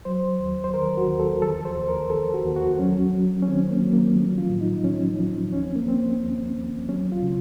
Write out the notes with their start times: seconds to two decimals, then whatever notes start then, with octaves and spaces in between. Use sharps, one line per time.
0.05 F#3 C5
0.39 D#2
0.64 C5
0.74 D#3 A#4
0.97 F#4
1.08 D#2
1.20 A4
1.42 F3 A4
1.65 C5
1.77 D#2
1.88 A#4
2.10 D#2 A4
2.34 F#4
2.45 D#2
2.56 F#4
2.79 F#3 C#4
3.13 F#3
3.42 C#4
3.47 D#3 C4
3.70 A#3
3.81 F#3
3.93 A#3
4.16 F3 A3
4.38 F4
4.49 A2
4.61 D#4
4.84 F3 C#4
5.19 F3
5.52 D#2 C#4
5.64 C4
5.76 A#3
5.86 D#2 C4
6.21 D#2
6.55 D#2
6.89 F#3 C#4
7.12 F4
7.23 C#3